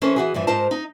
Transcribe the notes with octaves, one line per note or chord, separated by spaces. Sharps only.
E3 C#4 A4 A#4 C5
E3 F#4 G#4
G2 E3 F3
G#2 F4 A#4 C5 A5
D#4